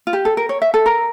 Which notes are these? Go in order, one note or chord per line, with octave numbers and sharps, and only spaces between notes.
F4
G4
A4
A#4
C#5
E5
A4
A#4